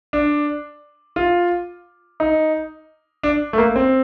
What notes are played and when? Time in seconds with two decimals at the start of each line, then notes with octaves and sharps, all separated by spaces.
0.13 D4
1.16 F4
2.20 D#4
3.23 D4
3.53 A3
3.58 A#3
3.76 C4